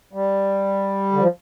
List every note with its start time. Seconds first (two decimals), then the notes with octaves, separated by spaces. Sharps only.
0.13 G3
1.12 D3
1.20 F3